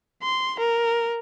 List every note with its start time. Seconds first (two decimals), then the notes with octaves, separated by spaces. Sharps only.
0.23 C6
0.60 A#4